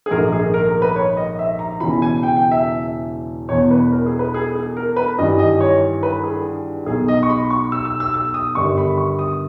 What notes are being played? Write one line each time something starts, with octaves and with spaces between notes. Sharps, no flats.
G#4
A#1 G#2 D#3 A#4
G#4
A#4
A#4
B4
C#5
D#5
E5
A#5
E1 E2 C#3 E3 B5
G#5
G5
G5
E5
E1 E2 B2 C#5
B4
A#4
G#4
B4
G#4
G#4
A#4
B4
G#1 G2 E3 D#5
D#5
C#5
B4
G#4
B1 B2 G#4
D#5
C#6
B5
C#6
E6
E6
E6
E6
D#6
G1 G2 D#3 C#6
B5
C#6
D#6